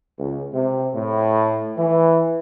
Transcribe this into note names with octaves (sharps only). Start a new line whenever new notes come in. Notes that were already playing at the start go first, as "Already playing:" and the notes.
C#2
C3
A2
E3